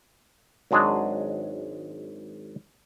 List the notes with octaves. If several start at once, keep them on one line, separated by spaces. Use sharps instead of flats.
G#1 F#3 G#3 D4 G#4